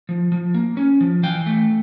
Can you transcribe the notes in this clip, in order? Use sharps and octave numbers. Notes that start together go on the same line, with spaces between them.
F3
F3
A#3
C#4
F3
E3 F5 G5
A3